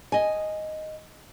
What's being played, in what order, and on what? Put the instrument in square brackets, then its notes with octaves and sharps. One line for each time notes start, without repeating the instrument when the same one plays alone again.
[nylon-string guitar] D#5 G#5